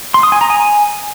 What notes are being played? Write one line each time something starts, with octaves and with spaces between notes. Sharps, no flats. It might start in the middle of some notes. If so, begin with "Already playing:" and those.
C6
D#6
G#5
A#5
G#5